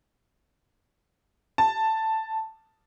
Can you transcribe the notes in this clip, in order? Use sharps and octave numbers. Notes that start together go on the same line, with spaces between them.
A5